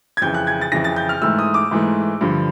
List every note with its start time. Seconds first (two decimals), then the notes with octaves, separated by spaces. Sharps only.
0.17 G#6
0.22 F2 C#3 E3 G6
0.34 F#6
0.47 G#6
0.61 A6
0.72 F2 C#3 E3 A#6
0.84 A6
0.96 G6
1.09 F6
1.22 G#2 E3 A3 E6
1.39 D#6
1.54 D6
1.71 G#2 E3 A3
2.21 G2 D3 F3